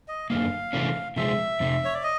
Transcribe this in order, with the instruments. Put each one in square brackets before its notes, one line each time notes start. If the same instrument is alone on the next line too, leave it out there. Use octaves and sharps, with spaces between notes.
[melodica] D#5
[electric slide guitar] F#2 D3 F3 A#3 [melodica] F5
[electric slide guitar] C3 E3 A3 C#4
[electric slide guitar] C3 F3 G#3 [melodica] E5
[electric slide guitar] F2 C3
[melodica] C#5
D5
D#5